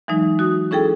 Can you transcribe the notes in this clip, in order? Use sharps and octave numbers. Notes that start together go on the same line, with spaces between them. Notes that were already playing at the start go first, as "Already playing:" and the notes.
E3 F#3 G#3 D#4
F#4 D#6
C#4 E4 G#4 A4 G5